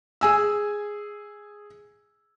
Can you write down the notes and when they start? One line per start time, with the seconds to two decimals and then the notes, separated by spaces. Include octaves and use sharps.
0.21 G#4 G#5 E6